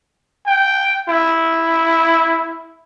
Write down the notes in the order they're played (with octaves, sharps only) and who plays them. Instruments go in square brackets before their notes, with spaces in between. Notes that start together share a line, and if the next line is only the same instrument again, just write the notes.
[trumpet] G5
E4